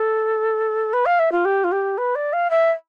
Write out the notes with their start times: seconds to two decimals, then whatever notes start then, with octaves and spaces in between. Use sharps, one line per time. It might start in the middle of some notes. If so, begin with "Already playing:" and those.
Already playing: A4
0.93 B4
1.05 F5
1.19 E5
1.32 F4
1.45 G4
1.64 F4
1.71 G4
1.98 B4
2.15 D5
2.33 F5
2.50 E5